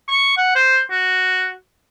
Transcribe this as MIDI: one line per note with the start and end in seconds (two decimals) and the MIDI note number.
0.08 0.32 85
0.38 0.52 78
0.55 0.79 72
0.91 1.52 66